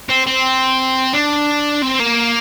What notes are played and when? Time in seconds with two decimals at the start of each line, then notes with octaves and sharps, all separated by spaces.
0.09 C4
0.27 C4
1.13 D4
1.82 C4
2.00 A#3